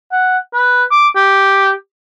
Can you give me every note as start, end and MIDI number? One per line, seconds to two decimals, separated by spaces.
0.12 0.37 78
0.53 0.83 71
0.91 1.08 86
1.16 1.72 67